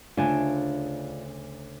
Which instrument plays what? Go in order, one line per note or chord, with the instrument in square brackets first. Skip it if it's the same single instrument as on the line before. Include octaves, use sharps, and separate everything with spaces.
[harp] D2 C#3 G#5 [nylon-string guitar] D4 F4